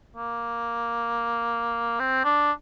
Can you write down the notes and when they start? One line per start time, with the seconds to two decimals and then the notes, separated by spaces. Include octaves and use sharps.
0.16 A#3
2.00 C4
2.24 D4